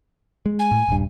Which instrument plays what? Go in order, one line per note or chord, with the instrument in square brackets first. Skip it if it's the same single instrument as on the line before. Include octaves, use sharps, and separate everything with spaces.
[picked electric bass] G#3
[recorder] G#5
[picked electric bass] A2
D#1 G2